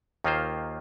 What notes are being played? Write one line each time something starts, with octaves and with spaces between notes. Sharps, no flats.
D#2 D#3 A#3 F4 C5